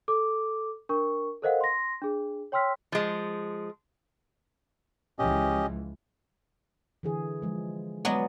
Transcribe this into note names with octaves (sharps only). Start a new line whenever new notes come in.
A4 D6
D4 A#4 C#6
A4 A#4 C5 D#5 F5 F#5
C6 A#6
D4 G#4
C#5 G5 C6 E6 F6 B6
F3 G#3
C#2 E3 F3 C#4 G4 D#5
D3 E3 G#4
F3 G#3
F#3 G#3 B3 D5